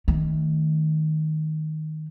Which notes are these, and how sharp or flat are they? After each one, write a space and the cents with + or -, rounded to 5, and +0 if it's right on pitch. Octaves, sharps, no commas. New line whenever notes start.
D#3 +0 A3 +0